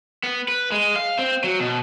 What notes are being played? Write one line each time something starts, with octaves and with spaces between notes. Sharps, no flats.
B3
B4
G#3
F5
C4
F#3
B2